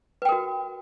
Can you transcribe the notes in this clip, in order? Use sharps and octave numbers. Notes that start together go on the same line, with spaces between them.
F#4 A#4 B4 G5